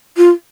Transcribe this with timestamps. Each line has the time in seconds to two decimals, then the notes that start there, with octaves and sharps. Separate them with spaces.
0.17 F4